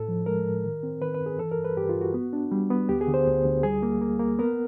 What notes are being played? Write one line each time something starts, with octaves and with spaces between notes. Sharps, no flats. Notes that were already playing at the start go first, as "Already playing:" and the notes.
Already playing: A2 A4
F3
G#3 A#4
A2
D#3
C4
D#3 B4
B4
G2
G#4
E3 A4
A#4
G2
B4
G2 G4
F4
G2
F#4
B3
D4
G3
B3
D2 G4
G#4
D3
C5
D2
D2
G3 G#4
A#3
A#3
A#3
B3 A#4